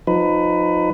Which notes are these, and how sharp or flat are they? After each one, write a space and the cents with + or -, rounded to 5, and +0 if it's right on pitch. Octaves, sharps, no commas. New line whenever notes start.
F3 +30 D#4 +0 B4 +20